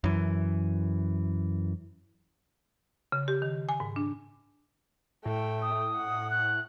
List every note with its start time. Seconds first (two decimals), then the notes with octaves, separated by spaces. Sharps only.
0.04 F#2 E3
3.12 C#3
3.28 G4
3.42 D#3
3.69 G#5
3.80 G#2
3.96 D4
5.25 A2 A3 G5
5.62 D#6
5.97 F#5
6.30 F#6